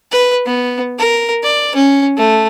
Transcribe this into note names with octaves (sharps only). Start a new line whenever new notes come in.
B4
B3
A#4
D5
C#4
A3